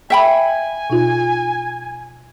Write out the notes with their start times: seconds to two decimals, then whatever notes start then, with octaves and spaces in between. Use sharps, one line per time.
0.10 E5 G5 G#5 B5
0.90 B2 D#4 F4